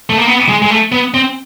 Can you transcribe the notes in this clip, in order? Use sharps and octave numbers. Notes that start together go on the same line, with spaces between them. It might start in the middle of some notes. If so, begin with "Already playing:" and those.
A3
A#3
B3
G#3
G#3
A3
B3
C4